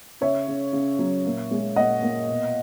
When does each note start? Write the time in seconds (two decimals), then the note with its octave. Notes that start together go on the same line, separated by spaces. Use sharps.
0.21 C#3 C#5 E5
0.48 C#3
0.73 C#3
0.99 F#3
1.25 A#2
1.51 G#3
1.76 A#2 D#5 F#5
2.02 A#2
2.28 B2